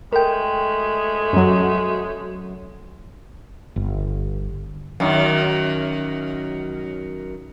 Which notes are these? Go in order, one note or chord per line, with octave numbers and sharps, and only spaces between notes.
G#3 A3 A#4 G5
F#2 F#3
G1
F#2 D#3